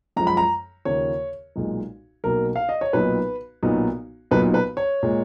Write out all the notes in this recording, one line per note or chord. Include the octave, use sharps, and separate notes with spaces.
F#2 F3 G#3 A#5
B5
A#5
D#2 C#3 F3 A#3 C#5
B1 A#2 G#3
B1 B2 A#3 A#4
F5
D#5
C#5
B1 A#2 F#3 B3 D#4 B4
B1 A#2 F#3 B3 D#4
B1 A#2 F#3 B3 D#4 B4
B4
C#5
A#2 G#3